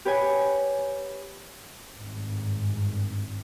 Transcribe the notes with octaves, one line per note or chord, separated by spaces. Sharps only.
G4 B4 C#5 G#5
G#1 G2